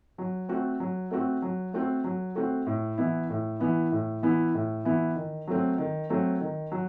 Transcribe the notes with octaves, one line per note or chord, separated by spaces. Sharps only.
F#3
A3 C4 F#4 A4
F#3
A3 C4 F#4 A4
F#3
A3 C4 F#4 A4
F#3
A3 C4 F#4 A4
A2
E3 B3 E4
A2
E3 B3 E4
A2
E3 B3 E4
A2
E3 B3 E4
D#3
F#3 A3 C4
D#3
F#3 A3 C4
D#3
F#3